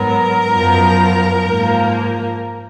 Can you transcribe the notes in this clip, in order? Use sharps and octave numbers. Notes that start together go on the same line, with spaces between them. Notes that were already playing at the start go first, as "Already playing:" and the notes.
Already playing: G#2 F#3 B3 A#4
F#2 F3 B3
G#2 F3 A#3